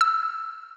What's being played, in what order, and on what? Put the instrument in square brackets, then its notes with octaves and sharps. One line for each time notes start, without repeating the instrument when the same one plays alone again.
[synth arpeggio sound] E6